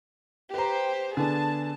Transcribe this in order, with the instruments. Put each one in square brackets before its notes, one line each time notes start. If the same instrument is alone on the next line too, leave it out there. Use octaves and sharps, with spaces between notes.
[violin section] G4 C5 [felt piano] B4 A#5
[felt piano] D3 B3 D4 [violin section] G#4 A5